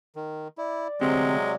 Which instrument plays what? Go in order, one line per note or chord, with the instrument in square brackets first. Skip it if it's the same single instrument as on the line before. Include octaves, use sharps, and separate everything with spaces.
[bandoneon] D#3
[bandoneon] E4 [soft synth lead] D5
[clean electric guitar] D2 C4 G4 [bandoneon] C3 F#3 [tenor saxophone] G#3